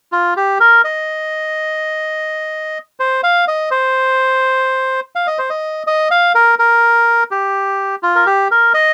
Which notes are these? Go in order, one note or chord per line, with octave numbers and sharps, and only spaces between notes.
F4
G4
A#4
D#5
C5
F5
D#5
C5
F5
D#5
C5
D#5
D#5
F5
A#4
A#4
G4
F4
A#4
G4
A#4
D#5